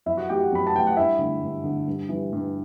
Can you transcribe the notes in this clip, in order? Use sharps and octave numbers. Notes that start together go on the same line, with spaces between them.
F#2 E4 E5
F#4 F#5
E3 A3 G4 G5
F#4 F#5
F#2 B5
A5
E3 A3 G5
F#5
G2 E4 E5
D3 A3
G2
D3 A3
G2
E3 G3
G2